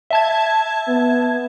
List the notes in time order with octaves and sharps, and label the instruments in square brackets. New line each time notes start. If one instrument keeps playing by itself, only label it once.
[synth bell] E5 A5 G#6
[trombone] B3